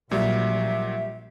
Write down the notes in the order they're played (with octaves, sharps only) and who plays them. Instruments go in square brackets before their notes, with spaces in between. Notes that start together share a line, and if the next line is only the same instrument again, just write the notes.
[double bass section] A#1 [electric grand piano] A#2 F#3 [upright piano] G3 [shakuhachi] E5